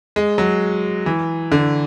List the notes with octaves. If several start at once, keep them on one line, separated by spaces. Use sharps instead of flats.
G#3
F#3
E3
D3